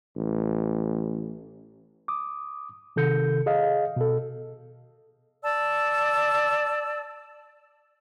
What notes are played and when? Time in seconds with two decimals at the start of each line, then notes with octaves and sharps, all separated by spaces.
0.17 A1
2.08 D6 D#6
2.96 C3 D#3 A4 G6 C#7
3.46 G#4 D#5 F5
3.96 B2 A4
5.43 D5 A5 E6